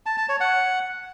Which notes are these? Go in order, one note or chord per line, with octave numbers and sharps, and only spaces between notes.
A5
A5
C#5
F#5